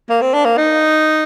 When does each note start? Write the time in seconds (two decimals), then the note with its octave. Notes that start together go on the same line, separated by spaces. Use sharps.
0.10 A#3
0.22 C4
0.34 D4
0.45 A#3
0.58 D#4